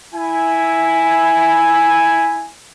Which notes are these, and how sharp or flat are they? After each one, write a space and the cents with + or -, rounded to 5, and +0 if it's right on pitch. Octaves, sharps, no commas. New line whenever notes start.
E4 +0 G#5 -5